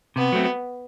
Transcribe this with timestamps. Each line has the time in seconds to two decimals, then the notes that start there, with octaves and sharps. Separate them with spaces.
0.16 C3 B3
0.32 F#3 A3 C4